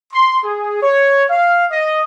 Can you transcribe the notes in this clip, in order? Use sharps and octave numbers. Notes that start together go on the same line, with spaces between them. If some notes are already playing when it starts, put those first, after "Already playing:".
C6
G#4
C#5
F5
D#5